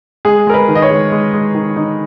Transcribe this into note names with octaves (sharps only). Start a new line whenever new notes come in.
G#3 G#4
G#3 A#4
B4
D#3
D#5
C#5
G#3
G#3
G#3
D#3
D#4